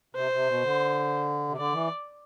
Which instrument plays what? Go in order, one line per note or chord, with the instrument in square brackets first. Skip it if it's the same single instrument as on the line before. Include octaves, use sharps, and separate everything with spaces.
[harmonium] C3 [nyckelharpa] C5
[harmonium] C3
B2
D3
C3
[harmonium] D3 [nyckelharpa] D5
[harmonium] E3